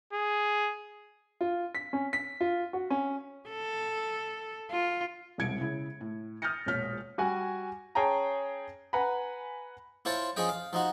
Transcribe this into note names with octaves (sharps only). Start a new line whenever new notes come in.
G#4
F4
B6
C#4
B6
F4
F#4
C#4
A4
F4
E1 C2 G#6 C#7 D7
C#3 E4
A2
D#6 F6 G6 A6 A#6 C#7
E1 A#1 C#5 F6 B6
G3 F#4 G#5
C#4 G#4 C#5 G5 A5 A#5
B4 F#5 G#5 A#5 B5
E4 F4 C5 C#5 A5
F3 C#4 G#4 D#5 G5
F5
F3 D#4 F#4